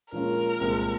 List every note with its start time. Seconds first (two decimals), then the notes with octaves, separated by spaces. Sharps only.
0.12 A#2 F3 G#3 C#4 F4 A#4
0.60 C2 A#2 G#3 C4